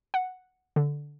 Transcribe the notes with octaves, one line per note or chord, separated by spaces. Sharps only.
F#5
D3